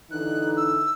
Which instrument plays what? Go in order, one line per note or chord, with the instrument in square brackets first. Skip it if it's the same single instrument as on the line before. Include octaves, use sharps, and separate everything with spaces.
[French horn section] D3 E3 D#4 [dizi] F#6
[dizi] E6